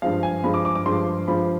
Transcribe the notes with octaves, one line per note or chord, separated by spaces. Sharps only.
G2 F3 G#3 F5
G#5
G2 F3 G#3 B5
D6
D6
D6
G2 F3 G#3 C6
G2 F3 G#3 B5